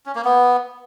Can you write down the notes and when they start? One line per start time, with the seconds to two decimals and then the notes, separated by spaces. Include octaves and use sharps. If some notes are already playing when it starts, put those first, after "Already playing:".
0.06 C#4
0.15 A#3
0.25 B3